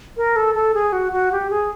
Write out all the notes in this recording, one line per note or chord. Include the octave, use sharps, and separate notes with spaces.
A#4
A4
A4
G#4
F#4
F#4
G4
G#4